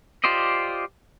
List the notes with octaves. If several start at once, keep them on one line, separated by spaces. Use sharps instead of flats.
F4 G4 C5 D5 D#5